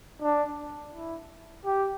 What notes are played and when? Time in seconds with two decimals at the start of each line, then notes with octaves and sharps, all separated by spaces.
0.22 D4
0.94 E4
1.65 G4